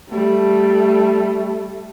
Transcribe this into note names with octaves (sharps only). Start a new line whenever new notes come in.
G3 A3